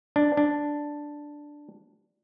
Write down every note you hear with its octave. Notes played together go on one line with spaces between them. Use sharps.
D4
D4